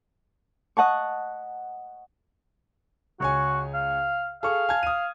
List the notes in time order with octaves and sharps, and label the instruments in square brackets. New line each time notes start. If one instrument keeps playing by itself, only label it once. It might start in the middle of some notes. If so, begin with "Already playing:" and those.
[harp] D#5 F#5 A5 C#6
[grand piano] C#2 C#5 G#5 [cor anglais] F#4
[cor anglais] F5
[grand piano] G#4 A4 C#6 [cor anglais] F5
[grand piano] G#5 A5 G#6
D#6 D#7